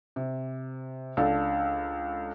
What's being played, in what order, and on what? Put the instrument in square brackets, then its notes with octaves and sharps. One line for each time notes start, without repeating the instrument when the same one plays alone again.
[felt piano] C3
C#2 D4 A4